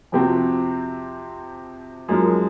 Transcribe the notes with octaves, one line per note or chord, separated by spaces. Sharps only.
F2 C3 F3 C4 F#4
F#2 F3 G#3 D#4 A#4